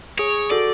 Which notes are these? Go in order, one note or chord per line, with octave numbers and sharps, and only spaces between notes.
G#4 C#5
F#4 A4 D5